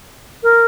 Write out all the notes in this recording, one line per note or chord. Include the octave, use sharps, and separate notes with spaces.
A#4